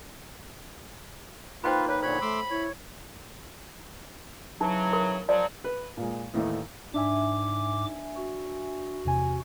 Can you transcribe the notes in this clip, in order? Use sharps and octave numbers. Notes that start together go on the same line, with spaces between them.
A#3 D#4 F4 B4 C5 G5 B5
B4 C#5
A#2 D3 C5 C#5 B5
A3 C6 D6 E6
E4 C#5
C#3 E3 F#3 D#4
A#4
F3 F#3 D5
B4
A#2 G#3
D#2 A2 E3 A3 D#4
G#2 D4 E5 G#5 D6
F#4
E2 C3 G#5